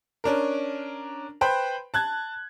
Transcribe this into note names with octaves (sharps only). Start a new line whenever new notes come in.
C#4 D4 A#4
B4 C5 G5 B5
A5 F#6 G#6